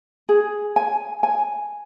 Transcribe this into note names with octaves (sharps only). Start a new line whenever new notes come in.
G#4
G#5
G#5